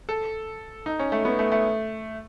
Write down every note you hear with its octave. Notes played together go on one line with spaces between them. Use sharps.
A4
D#4
C#4
A3
B3
A3
A3